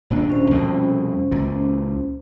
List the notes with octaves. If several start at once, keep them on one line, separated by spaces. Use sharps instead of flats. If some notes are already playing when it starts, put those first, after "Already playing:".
D#1 A#2 D4
C#4 C5
C2 F2 B2
C#2 A#2